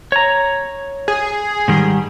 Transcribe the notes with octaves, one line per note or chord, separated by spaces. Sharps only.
C#5 A#5
G#4
G#2 D#3 G3